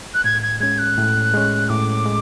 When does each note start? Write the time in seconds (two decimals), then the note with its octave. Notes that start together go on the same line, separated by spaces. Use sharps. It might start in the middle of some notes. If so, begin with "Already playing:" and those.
0.14 F#6
0.24 A2 G#6
0.42 G#6
0.60 G#3 C#4 G#6
0.79 F#6
0.97 A2
1.34 G#3 C#4
1.69 A2 D6
2.06 G#3